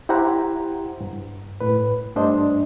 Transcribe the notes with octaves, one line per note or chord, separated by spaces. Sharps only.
E4 G4 C5 F#5 A#5
G2
A2 B4
G2 G3 A3 D4 C5 D#5